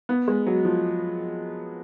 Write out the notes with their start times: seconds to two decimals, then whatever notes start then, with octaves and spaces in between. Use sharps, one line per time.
0.09 B3
0.28 G#3
0.47 F#3
0.65 F3